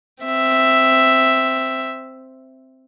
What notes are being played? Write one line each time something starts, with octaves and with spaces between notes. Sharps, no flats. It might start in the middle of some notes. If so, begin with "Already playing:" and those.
C4 E5